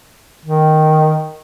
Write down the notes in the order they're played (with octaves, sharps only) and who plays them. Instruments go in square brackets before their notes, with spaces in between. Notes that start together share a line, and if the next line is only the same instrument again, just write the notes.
[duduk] D#3